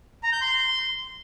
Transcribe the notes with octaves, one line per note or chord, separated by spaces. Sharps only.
A#5
G6
C6